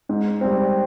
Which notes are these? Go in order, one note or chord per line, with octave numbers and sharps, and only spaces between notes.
G#2
G3 C4